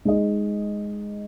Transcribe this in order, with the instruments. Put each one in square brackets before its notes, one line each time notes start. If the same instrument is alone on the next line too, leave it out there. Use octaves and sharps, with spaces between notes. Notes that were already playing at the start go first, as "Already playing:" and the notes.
[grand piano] G#3 D#4 G#4 D#5